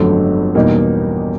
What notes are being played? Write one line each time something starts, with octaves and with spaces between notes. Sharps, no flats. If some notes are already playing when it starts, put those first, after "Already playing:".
Already playing: G1 F2 D3 F#3 A3
E2 B2 G3 A#3 D#4